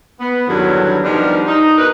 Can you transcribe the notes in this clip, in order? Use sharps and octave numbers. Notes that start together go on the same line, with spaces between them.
B3
E2 G2 D3 D#3 F#3
D#3 F3 G3 B3 D4 D#4
D#4
B2 D#4 A#4 B4